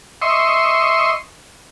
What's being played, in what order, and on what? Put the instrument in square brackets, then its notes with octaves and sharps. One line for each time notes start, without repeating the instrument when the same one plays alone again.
[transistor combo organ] D#5 E5 C6 C#6